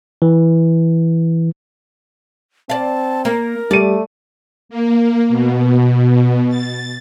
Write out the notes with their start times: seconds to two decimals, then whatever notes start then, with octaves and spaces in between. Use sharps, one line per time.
0.22 E3
2.70 C4 D5 F5 A5
3.25 A#3 A#4
3.71 G3 A3 D5 D#7
4.69 A#3
5.29 B2
6.49 A6